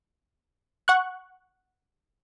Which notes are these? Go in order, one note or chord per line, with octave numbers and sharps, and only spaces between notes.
F#5 C#6 F#6